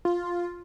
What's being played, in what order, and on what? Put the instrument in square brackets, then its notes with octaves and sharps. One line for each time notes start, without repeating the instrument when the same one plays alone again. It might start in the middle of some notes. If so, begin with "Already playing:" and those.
[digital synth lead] F4